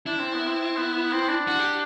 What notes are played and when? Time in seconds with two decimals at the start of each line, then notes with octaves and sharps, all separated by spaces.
0.06 D4 E4
0.20 C4
0.34 B3
0.46 C4
0.77 B3
0.94 B3
1.12 C4
1.29 D4
1.48 F#4
1.59 G4